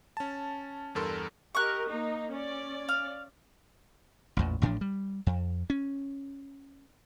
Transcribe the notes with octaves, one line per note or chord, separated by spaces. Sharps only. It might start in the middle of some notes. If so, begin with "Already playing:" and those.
C#4 A5
E2 G2 A4 A#4 C6
G4 A#4 D#5 C#6 F#6
A#3 D#4
C#4 D5
F5
A1 E2 A#2
A1 A2 F3 D4
G3
F2
C#4